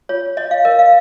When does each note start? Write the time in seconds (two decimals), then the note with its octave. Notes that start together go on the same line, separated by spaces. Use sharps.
0.09 F4 C#5
0.37 C#5 D#5
0.51 F5
0.65 A#4 D#5
0.79 F5